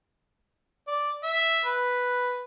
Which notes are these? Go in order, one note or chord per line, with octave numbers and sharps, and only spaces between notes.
D5
E5
B4